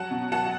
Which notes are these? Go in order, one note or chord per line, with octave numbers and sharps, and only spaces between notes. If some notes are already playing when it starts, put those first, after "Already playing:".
Already playing: F#3 F#5 A5
B2
F#3 F#5 A5